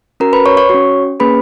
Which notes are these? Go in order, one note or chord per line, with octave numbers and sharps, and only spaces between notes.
C#4 F#4 A#4 A#5
B4 B5
C#5 C#6
C#5 C#6
C#4 F#4
A#3 C#4 G#4 B4 B5